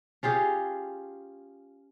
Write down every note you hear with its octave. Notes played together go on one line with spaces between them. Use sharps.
C#4 F4 G4 G#4